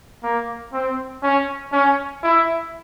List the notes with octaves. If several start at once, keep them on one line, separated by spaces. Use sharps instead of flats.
A#3
C4
C#4
C#4
E4